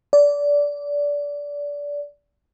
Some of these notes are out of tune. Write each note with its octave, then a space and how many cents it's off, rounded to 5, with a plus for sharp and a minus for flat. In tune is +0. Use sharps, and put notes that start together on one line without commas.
D5 -20